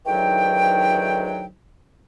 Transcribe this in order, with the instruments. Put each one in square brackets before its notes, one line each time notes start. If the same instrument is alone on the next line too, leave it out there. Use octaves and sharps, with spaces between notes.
[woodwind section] D2 G#2 D#3 E3 F#3 G5